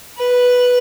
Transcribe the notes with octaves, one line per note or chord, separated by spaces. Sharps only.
B4